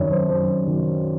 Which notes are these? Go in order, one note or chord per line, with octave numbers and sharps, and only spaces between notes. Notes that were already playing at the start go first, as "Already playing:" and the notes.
Already playing: F#2 D#3 F#3 C#5 D5
C5
F#2 C5
D#3 F#3